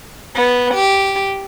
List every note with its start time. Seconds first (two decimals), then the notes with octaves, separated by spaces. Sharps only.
0.35 B3
0.73 G4